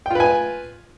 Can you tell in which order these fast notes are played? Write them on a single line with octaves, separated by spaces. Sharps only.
G5 F4 B4 G#5